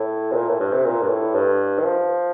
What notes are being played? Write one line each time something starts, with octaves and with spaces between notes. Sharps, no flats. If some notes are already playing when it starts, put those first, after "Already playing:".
Already playing: A2
C3
A#2
A2
G2
C3
A#2
G2
A2
G2
D#3
F3